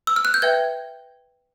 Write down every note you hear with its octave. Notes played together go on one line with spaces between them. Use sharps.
E6
F6
F#6
G6
B4 E5 G5 G#6